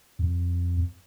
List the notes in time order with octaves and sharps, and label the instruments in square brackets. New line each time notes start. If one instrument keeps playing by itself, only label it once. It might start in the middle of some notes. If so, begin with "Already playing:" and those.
[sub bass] F2